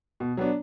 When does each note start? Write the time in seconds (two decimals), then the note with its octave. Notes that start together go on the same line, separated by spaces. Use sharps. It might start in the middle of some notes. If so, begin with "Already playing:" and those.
0.20 B2
0.37 F#3 B3 D4